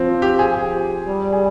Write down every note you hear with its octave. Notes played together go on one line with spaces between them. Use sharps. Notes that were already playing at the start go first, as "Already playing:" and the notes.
Already playing: F3 C4
G4
G#4
G3
G#4